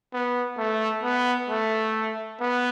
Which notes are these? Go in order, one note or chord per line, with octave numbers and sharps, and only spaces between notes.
B3
A3
B3
A3
B3